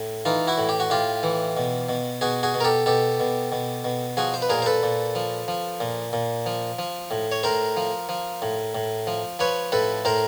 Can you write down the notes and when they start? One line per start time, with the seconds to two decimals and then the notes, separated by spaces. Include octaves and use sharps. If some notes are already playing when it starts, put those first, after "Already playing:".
Already playing: A2
0.25 E3 D#4 F4
0.48 E4 F#4
0.58 A2
0.69 G4
0.80 F#4
0.90 A2 F4 G4
1.23 E3
1.57 B2
1.89 B2
2.21 B2 F#4 G#4
2.43 F#4 G#4
2.54 B2
2.61 A#4
2.64 G4 A4
2.86 B2 G4 A4
3.20 B2
3.52 B2
3.85 B2
4.17 F3 F#4 G#4
4.34 C5
4.42 B4
4.49 A#2 G#4 A#4
4.62 C5
4.66 A4 B4
4.83 A#2
5.15 F3
5.48 F3
5.81 A#2
6.13 A#2
6.46 F3
6.79 F3
7.11 A2
7.32 C#5
7.43 A2 A#4 C5
7.77 F3
8.09 F3
8.42 A2
8.75 A2
9.07 F3
9.39 F3 B4 C#5
9.72 A2 A4 B4
10.05 A2 A#4 C5